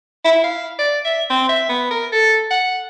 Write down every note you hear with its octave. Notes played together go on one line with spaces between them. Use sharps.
E4
F5
D5
E5
C4
E5
B3
A#4
A4
F#5